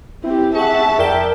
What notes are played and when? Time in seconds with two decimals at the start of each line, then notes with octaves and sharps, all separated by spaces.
0.24 C4 E4 G4
0.55 G#4 E5 F#5 A5 C#6
0.99 F2 A#4 D5 G5